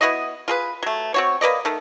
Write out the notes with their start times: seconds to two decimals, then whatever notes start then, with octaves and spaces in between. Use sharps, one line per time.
0.01 B3 E4 F#4 D#5
0.48 F4 G#4 B4
0.83 F#3 A3
1.14 C4 F#4 C#5
1.41 A#3 B4 D5 D#5
1.65 D#3 A3